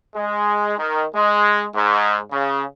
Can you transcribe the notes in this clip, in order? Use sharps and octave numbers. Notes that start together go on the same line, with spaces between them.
G#3
D#3
G#3
G#2
C#3